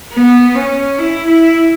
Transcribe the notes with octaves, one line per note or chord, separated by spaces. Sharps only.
B3
C#4
E4
E4